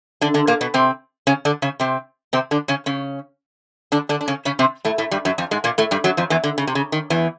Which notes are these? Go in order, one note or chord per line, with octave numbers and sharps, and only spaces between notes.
D3 D4
D3 D4
A#2 A#3
B2 B3
C3 C4
C#3 C#4
D3 D4
C#3 C#4
C3 C4
C3 C4
D3 D4
C#3 C#4
C#3 C#4
D3 D4
D3 D4
D4
C#3 C#4
C#3 C#4
C3 C4
A2 A3
A2 A3
G2 G3
F#2 F#3
F2 F3
G#2 G#3
A#2 A#3
A2 A3
G2 G3
F#2 F#3
F2 F3
E2 E3
D3
C#3
C3
C#3
D#3
E2 E3